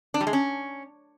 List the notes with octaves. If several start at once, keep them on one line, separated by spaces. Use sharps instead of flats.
D4
G3
G#3
C#4